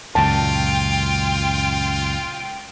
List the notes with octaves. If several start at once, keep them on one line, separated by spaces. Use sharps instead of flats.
C#2 F#2 A#2 F4 G5 A5